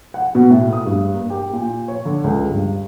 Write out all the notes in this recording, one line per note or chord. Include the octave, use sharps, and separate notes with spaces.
F#5
B2
A2
D#6
G2
A#3
G4
A#2
C#5
D3
C#2
G2